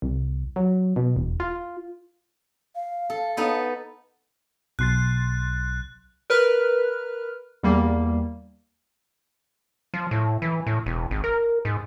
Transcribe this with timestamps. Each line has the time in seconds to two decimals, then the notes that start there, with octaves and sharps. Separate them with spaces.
0.02 C2
0.56 F#3
0.96 B2
1.16 E1
1.40 F4
2.75 F5
3.10 A4
3.37 B3 D#4 A4
4.79 B1 C6 F#6 A6
6.30 A#4 B4 F6 F#6
7.63 E2 G3 A#3
9.94 F3
10.11 A2
10.42 E3
10.67 A2
10.86 E1
11.11 G#1
11.24 A#4
11.65 G#2